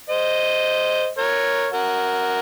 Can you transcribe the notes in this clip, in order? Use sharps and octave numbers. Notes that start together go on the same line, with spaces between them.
C5 D#5
A#4 C#5
F#4 A#4